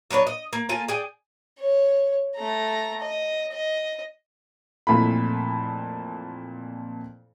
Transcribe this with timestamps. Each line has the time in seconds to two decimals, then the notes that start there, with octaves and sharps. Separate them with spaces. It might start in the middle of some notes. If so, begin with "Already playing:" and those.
0.11 F#3 D4 B4 C#5
0.27 D#5
0.53 A#3
0.69 A#3 F4 A4 G#5
0.88 G#4 D5 G5 G#5
1.59 C#5
2.37 A3 A#5
3.01 D#5
3.52 D#5
4.87 F2 A#2 E3 A3 B5